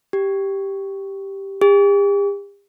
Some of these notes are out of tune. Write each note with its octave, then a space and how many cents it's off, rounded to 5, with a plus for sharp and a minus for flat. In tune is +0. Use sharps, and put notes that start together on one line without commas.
G4 +0
G4 +45